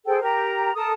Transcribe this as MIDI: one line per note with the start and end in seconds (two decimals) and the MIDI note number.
0.06 0.20 68
0.06 0.20 69
0.06 0.20 72
0.06 0.20 79
0.21 0.72 67
0.21 0.72 70
0.21 0.72 82
0.75 0.92 69
0.75 0.92 70
0.75 0.92 81
0.75 0.92 87